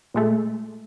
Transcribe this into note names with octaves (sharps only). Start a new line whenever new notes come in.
A#2 G#3 A3